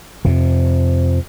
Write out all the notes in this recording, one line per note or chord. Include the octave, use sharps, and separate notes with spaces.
F2 C3